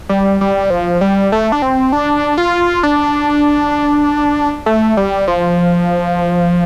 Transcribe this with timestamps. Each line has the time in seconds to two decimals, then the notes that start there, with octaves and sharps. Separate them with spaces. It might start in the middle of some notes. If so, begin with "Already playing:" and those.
0.09 G3
0.41 G3
0.70 F3
1.01 G3
1.32 A3
1.52 D4
1.62 C4
1.92 D4
2.38 F4
2.83 D4
4.66 A3
4.97 G3
5.28 F3